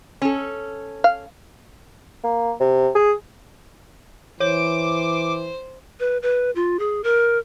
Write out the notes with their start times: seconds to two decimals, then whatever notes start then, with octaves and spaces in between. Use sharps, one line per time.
0.22 C#4 A4
1.04 F5
2.24 A#3
2.60 C3
2.95 G#4
4.40 E3 C5 C#5 D6
6.00 B4
6.22 B4
6.56 F4
6.79 G#4
7.04 A#4